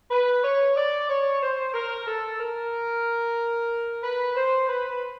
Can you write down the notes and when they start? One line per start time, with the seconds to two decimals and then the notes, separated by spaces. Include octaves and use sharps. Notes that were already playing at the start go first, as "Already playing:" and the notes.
0.11 B4
0.43 C#5
0.76 D5
1.09 C#5
1.41 C5
1.74 A#4
2.06 A4
2.40 A#4
4.03 B4
4.35 C5
4.68 B4